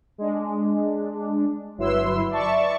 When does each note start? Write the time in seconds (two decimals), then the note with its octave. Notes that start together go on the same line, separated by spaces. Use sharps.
0.18 G#3 D4
1.77 G1 F#3 E4 B4 C6 E6
2.30 D5 E5 A5 C#6